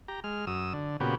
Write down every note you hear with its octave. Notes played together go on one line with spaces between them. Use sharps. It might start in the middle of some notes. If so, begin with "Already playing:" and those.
G4 A#5
G#3 F6
F#2 D#6 E6
D3
A#2 C#3 B3 F#4 G4